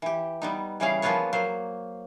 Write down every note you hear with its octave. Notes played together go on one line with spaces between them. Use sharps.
E3 G4
G3 B3 D#4
C#3 E3 G3 C#4 G#4 F5
F3 A#3 B3 F4 B4 C#5
F#3 A#3 C5